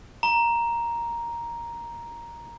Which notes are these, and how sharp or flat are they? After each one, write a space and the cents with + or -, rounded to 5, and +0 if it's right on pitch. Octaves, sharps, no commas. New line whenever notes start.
A#5 +5